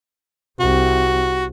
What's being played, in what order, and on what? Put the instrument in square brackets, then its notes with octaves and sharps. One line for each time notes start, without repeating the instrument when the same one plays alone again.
[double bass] C2 [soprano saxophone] F#4